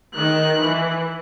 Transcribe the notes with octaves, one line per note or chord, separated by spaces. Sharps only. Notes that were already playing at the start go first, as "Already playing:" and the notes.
D#3 F#6
E3